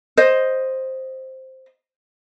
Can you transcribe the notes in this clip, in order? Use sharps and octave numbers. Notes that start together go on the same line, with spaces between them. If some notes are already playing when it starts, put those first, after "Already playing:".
C5 D#5